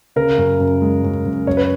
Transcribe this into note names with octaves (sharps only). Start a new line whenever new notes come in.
C#3 A#4
F#2
F#2
G#3
F#2
F#2
F#2 C#5
B4